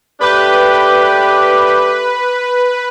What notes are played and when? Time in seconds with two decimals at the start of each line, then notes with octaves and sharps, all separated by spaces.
0.21 A3 D4 G4 B4